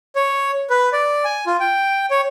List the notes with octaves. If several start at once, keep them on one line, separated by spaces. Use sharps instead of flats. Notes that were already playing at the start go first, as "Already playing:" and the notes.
C#5
B4
D5
G#5
F4
G5
C#5